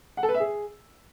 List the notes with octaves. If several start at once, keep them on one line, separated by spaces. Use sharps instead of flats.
F#5
A4
B4
E5
G#4